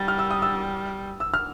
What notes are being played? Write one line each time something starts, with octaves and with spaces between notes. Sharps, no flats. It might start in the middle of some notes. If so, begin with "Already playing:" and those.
Already playing: G3 A6
F6
E6
D#6
E6
E6
F6